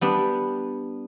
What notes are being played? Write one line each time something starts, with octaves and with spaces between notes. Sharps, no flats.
G3 B3 D4